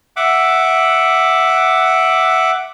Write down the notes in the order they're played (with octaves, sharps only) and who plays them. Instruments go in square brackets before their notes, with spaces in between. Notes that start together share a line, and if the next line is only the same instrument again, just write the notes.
[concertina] E5 F#5 D6